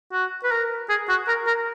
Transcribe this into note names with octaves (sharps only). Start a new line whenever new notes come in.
F#4
B4
A#4
G#4
F#4
A#4
A#4